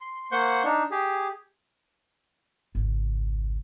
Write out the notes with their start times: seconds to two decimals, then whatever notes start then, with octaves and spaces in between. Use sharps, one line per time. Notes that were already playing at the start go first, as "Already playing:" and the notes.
0.01 C6
0.32 A#3 C5 F#5 C#6 G6
0.64 D4 D#4
0.91 G4 G#4
2.75 G#1 C#2